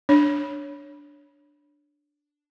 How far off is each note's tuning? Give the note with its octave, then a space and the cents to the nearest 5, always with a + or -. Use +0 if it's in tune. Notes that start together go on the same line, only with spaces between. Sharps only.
D4 +0 C#5 +0